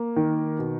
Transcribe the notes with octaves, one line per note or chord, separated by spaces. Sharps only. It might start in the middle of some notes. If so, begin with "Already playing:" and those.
Already playing: A#3
D#3
B2